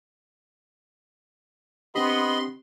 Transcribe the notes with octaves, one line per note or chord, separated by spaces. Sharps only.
B3 C4 D4 G4 D#5 B5 C6